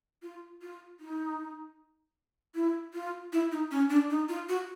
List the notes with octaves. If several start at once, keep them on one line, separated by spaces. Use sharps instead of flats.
F4
F4
D#4
E4
F4
E4
D#4
C#4
D4
D#4
F4
F#4